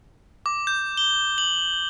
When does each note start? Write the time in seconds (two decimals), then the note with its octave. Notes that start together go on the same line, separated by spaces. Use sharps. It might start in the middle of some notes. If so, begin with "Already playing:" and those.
0.46 D6
0.67 G6
0.97 G7
1.38 F#7